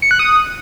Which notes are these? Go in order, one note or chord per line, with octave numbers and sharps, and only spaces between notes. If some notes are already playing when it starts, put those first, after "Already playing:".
C#7
F#6
D#6